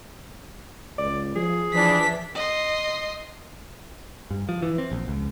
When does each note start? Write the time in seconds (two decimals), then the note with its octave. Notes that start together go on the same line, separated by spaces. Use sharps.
0.98 C#2 D5
1.36 F3 G#4
1.74 E3 F3 D4 B6
2.35 D#5 C6
4.31 G2
4.49 F3
4.62 E3
4.78 C4
4.92 A#1
5.08 C#2